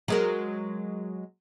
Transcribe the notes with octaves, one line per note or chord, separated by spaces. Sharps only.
F#3 G#3 A#4